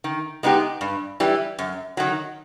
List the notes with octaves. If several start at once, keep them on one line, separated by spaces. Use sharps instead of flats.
D#3
G#3 B3 D#4 G4
G2
E3 G3
F#2
D#3 F#3